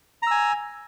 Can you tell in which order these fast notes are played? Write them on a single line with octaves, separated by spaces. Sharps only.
A#5 E6 G#5